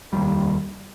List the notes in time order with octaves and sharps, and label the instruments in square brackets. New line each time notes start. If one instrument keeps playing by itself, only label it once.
[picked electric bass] F1 D#2 G3